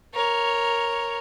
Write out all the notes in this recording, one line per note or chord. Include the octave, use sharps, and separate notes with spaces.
A#4 C#5